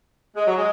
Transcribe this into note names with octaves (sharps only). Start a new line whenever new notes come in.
G#3
F#3
G#3